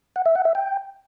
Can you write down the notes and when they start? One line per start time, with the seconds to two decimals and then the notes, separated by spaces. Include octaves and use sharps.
0.16 F#5
0.26 E5
0.35 F#5
0.45 E5
0.55 G5